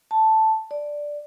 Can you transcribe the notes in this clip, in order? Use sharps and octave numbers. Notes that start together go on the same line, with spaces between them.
A5
D5